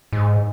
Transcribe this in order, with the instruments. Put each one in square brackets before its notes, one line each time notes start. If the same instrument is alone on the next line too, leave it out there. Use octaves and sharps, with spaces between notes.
[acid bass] G#2